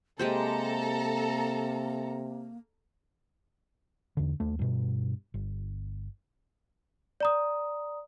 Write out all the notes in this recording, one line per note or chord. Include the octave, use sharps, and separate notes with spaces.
C3 G#3 A#3 G4 A4 C5 A#5
E2 D3
D#2 A3
G2 B2
G1
D5 A#5 D#6